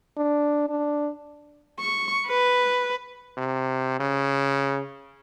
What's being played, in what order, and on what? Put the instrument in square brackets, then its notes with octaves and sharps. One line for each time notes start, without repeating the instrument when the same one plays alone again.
[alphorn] D4
D4
[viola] C#6
B4
[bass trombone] C3
C#3